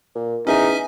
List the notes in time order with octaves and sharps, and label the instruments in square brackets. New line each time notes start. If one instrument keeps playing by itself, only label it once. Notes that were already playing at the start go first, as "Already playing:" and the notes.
[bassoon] A#2
[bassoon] E2 [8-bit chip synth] C#4 E5 G#5 [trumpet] D#4